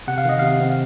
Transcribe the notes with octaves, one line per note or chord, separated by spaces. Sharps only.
C3 F#5
F5
D#3 D#5
C3 F5
C4